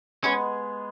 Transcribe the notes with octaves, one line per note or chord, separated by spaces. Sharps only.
G#3 B3 C#4 G#4